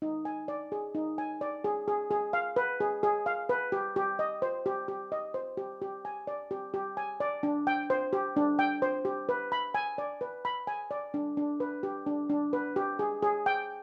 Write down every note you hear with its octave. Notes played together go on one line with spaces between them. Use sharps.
D#4
G#5
D5
G#4
D#4
G#5
D5
G#4
G#4
G#4
F5
B4
G#4
G#4
F5
B4
G4
G4
D#5
C5
G4
G4
D#5
C5
G4
G4
G#5
D5
G4
G4
G#5
D5
D4
G5
C5
G4
D4
G5
C5
G4
B4
B5
G#5
D5
B4
B5
G#5
D5
D4
D4
B4
G4
D4
D4
B4
G4
G#4
G#4
G5